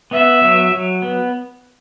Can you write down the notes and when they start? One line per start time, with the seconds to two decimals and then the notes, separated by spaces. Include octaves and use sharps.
0.11 B3 E5
0.42 F#3
0.71 F#3
1.02 B3